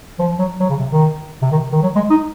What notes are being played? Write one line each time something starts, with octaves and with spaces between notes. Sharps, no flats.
F3
F#3
F#3
C#3
C3
D#3
C3
D#3
D#3
F#3
G#3
D#4